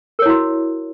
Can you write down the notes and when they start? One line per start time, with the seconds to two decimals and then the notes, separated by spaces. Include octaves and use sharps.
0.19 A#4
0.22 C#5
0.26 E4
0.29 F#4